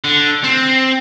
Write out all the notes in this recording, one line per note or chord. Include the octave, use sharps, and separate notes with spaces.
D3
C4